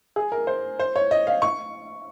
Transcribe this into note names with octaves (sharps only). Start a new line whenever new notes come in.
G#4
A#4
C5
C5
C#5
D#5
F5
C#6